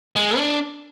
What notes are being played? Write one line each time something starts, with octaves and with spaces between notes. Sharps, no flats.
G#3
D4